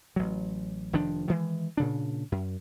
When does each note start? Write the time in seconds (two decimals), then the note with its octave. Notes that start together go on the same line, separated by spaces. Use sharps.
0.16 A1 F#3
0.93 F1 D#3 F3 D4
1.28 D#3 E3 G#3
1.77 A#2 C#3 D4
2.32 F#2